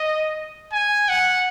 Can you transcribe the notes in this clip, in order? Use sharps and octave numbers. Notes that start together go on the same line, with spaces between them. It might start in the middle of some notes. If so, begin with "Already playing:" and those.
Already playing: D#5
G#5
F#5